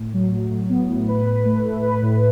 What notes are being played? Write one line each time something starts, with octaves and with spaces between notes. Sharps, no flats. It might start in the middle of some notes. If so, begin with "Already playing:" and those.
Already playing: A2
F#3
A2
A2
B3
A2
B4
B4
A3
A3
B4
A2